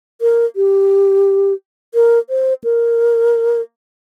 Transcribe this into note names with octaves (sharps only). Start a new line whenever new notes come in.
A#4
G4
A#4
C5
A#4